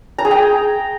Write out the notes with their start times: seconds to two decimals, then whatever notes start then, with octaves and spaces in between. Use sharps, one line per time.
0.18 A#5
0.25 G#4
0.31 G5